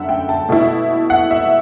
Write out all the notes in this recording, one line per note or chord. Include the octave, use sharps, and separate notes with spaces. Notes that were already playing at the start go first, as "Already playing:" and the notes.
Already playing: F#2 D3 A3 E5 F#5
G5
A5
B2 A3 E4
F#5
E5